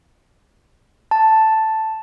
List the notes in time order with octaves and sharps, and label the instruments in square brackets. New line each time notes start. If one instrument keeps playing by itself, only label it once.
[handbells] A5